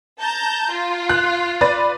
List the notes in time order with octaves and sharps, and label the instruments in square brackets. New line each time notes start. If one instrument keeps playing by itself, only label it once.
[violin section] A5 A#5 G6
F4
[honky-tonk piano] F#6
B4 D5 A6